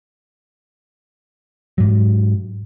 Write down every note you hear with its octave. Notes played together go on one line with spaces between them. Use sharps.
G#2 F#3